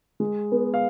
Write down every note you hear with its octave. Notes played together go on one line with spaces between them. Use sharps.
G#3
B3
F5